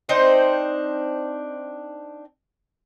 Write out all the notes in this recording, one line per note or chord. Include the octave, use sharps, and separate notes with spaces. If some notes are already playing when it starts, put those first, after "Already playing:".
C4 D4 D#4 C5